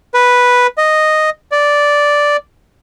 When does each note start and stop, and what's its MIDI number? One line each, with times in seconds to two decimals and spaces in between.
0.14 0.67 71
0.78 1.30 75
1.52 2.37 74